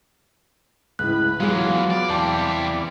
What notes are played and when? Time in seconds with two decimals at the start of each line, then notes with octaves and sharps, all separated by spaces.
0.99 C#2 A2 B4 F#6
1.40 E3 F#3 G#3 B3 F4 G#4 F5
1.90 D5
2.09 E2 G3 C4 D5 G5 A5 D6